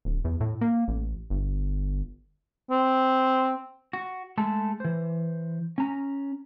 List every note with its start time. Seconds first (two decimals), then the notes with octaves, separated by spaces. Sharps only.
0.05 D1
0.25 E2
0.41 A2
0.61 A#3
0.88 A1
1.30 G1
2.70 C4
3.93 F#4
4.38 G#3 A3 A4
4.80 E3 C5
5.78 C#4 A#5